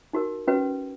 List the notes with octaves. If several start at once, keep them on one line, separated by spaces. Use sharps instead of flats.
D#4 F#4 A#4
C#4 F#4 B4